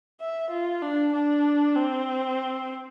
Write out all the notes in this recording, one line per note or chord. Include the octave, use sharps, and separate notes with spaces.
E5
F4
D4
D4
C4